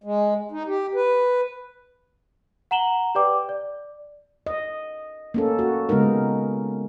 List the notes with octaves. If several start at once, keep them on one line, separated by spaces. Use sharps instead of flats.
G#3
D#4
G4
B4
F#5 A#5 E7 F#7 G7
G4 B4 D5 G5 D6
D5
D#5
A#3 C#4 A4
F#4
C#3 G#3 B3 D#4 A#4